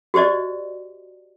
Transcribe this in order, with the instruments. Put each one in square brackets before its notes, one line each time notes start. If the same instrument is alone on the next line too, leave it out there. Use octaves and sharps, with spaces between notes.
[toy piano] F#4 G4 C5 D5 D#5